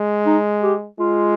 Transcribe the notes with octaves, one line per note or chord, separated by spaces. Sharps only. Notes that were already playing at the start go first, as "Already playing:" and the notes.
Already playing: G#3
D#4
G4
G#3 F4